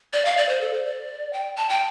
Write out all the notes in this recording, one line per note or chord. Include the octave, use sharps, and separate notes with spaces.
D5
F5
D5
C5
A4
C5
D5
G5
A5
G5